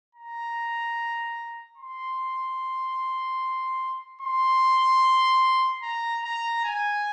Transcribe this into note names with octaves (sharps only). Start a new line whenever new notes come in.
A#5
C6
C6
A#5
A#5
G#5